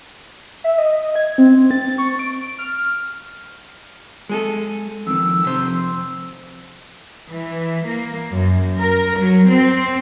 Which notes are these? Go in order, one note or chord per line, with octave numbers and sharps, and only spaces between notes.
E5
D#5
G#6
C4
A6
C#6
D7
F6
G#3 G#4 A4
F2 D#3 E6
F2 C3 C5
E3
A#3
F#2
A#4
F#3
C4